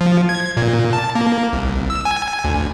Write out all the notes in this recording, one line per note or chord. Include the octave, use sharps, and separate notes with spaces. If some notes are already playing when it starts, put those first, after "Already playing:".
F3
G#6
A#2
A5
A#3
C2
E6
G#5
D2